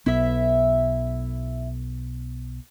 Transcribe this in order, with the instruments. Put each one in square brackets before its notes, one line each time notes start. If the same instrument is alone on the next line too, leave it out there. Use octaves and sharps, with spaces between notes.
[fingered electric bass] B1 B3 [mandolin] E4 E5